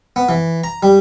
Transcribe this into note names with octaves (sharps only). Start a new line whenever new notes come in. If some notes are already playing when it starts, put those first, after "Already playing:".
B3
E3
A#5
G3